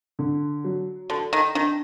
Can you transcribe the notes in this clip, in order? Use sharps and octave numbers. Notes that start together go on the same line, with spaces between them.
D3
F#3
D3 A4
D#3
D#3 D4